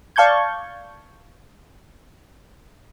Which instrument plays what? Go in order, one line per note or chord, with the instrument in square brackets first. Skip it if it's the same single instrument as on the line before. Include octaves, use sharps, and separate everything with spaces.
[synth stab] D5 F5 A5 C#6 G6 G#6